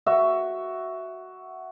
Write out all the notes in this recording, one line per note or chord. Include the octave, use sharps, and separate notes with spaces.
F#4 E5